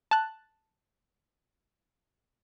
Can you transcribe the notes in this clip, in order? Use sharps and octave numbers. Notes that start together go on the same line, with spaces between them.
A5 F#6